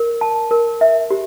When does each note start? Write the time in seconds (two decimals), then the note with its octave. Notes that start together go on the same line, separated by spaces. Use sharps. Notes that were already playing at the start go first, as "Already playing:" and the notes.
Already playing: A#4
0.21 A5
0.51 A#4
0.81 E5
1.11 G4